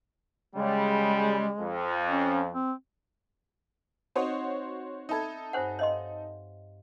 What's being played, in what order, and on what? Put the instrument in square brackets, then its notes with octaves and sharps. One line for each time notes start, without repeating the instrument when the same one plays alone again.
[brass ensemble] C#3 G3 [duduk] G#3
[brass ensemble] F2
[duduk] C#4
C4
[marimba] C4 D#4 D#5 [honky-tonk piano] F#4 C5 C#5
[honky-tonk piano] D#4 A4 [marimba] E5 B5 G#6
[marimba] G2 G#5 [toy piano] C5 C#5 F#5
[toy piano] C#5 D#5 C6 [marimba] F5